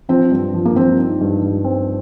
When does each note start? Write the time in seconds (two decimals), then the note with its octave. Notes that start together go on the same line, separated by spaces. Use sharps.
0.09 F3 C4
0.31 G2
0.54 F3
0.65 A#3
0.76 F3 C4
0.98 D#4
1.21 G2
1.42 G2
1.64 C4